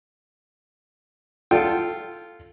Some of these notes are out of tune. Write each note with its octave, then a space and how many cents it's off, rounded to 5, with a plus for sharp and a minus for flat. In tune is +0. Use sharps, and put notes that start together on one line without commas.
F4 -10 A4 +0 G5 +0